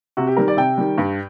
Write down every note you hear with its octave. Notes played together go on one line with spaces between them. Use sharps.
C3 F#4
G4
D#3 G3 A#4
D5
C3 G5
D#3 G3
G2